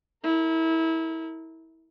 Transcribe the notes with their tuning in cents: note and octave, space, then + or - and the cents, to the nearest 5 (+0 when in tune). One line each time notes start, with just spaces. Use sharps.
E4 -25 A#4 -25